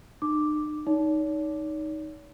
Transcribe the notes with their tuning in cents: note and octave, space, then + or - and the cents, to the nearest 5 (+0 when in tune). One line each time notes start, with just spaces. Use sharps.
D#4 -45 D6 +0
D#4 +0 C#5 +45